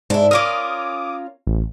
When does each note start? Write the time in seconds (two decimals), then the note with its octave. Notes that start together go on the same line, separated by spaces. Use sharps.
0.10 G#2 D4 E4
0.31 C#4 F4 A#4 D6 D#6
1.47 A1